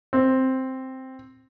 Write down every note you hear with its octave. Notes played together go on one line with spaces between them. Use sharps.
C4